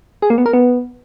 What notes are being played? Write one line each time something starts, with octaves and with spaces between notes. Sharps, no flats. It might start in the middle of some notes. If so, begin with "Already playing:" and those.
G#4
A#3
B3
A#4
B3